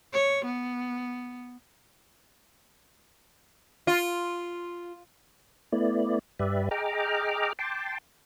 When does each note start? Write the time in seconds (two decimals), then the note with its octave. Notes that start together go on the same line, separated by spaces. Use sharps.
0.14 C#5
0.45 B3
3.87 F4
5.72 A3 B3 E4 D5
6.39 G2 G4 B4 D5 E5
6.71 G#4 D#5 G5 A#5 D6 F6
7.59 G5 A5 C6 D6